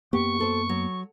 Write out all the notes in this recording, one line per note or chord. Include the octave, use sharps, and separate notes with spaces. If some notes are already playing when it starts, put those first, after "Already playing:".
F#2 A#3 B3 G4 C#6
F#4 A4 C5
F#3